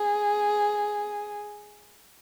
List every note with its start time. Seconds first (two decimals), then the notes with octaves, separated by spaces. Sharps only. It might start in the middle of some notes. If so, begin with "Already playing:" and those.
Already playing: G#4